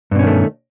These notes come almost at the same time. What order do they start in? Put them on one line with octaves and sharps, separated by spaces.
G2 B2 C#4 D#3 A3